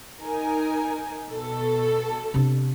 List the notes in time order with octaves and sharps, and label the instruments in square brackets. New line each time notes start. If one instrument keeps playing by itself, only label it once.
[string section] D#4 A#4 G#5
B2 A4
[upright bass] C3 D4